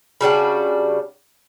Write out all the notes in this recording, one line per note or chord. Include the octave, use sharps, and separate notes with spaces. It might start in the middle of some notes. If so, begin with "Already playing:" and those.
C#3 G3 D4 F#4